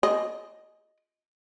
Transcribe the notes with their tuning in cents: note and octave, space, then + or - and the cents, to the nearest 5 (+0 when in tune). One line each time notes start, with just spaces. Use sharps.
G#4 +20 D#5 +0